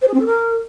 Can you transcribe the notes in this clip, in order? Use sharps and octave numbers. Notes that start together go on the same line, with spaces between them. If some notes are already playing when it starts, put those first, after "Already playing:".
C5
G#4
C4
A4
A#4